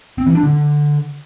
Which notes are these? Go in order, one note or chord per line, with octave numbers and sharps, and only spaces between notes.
C4
E3
D4
D3